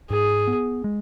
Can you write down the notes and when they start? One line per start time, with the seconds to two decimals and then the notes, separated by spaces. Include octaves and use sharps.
0.10 G#2 G#4
0.47 B3
0.84 G#3